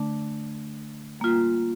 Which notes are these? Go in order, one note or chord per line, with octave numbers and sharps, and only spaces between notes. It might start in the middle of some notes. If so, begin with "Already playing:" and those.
Already playing: D3 A3 D4
G3 A#3 F4